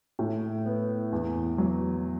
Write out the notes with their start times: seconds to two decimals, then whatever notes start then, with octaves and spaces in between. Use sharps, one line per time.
0.19 A2
0.66 B3
1.12 E2
1.58 F#3